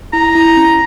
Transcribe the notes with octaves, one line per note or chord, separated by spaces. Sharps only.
E4 A#5
E4
C#4